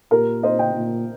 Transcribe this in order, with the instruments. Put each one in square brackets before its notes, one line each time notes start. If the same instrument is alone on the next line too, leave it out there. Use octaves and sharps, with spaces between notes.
[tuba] A#2 [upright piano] G4 A#4
[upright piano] C5 D#5
D#5 G5
[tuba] A#2